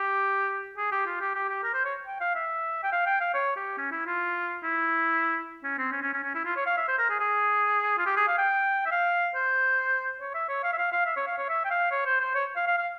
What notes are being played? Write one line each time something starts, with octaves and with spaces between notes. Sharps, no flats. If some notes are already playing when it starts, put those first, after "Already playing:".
Already playing: G4
G#4
G4
F4
G4
G4
G4
A#4
C5
C#5
G5
F5
E5
G5
F5
G5
F5
C#5
G4
C#4
E4
F4
E4
C#4
C4
C#4
C#4
C#4
C#4
E4
F4
C#5
F5
E5
C5
A#4
G#4
G#4
F4
G4
G#4
F5
G5
E5
F5
C5
C#5
E5
C#5
F5
E5
F5
F5
E5
C#5
F5
C#5
E5
G5
F5
C#5
C5
C5
C#5
F5
F5
F5